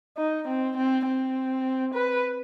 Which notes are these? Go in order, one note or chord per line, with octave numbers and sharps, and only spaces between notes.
D#4
C4
C4
C4
B4